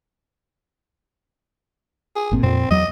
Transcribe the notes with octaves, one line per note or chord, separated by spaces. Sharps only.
G#4
G1 A#2 C4
F2 A#2 C4
E2 F#3 D#5